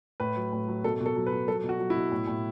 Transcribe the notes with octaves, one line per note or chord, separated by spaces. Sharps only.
A2 B4
F#3
A2
F#3
B2 A4
B2
A4
F#3
B4
F#3
F#3 A4
B2
F#4
F#3
E4
B2
A2
A2